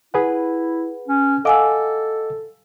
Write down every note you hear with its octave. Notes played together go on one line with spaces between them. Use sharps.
E4 G#4 B4 F#5
C#4
A4 D#5 F5 F#5 G#5 D6 E6